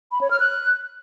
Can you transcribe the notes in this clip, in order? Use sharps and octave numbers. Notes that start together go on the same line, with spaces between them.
B5
C#5
F6
F#6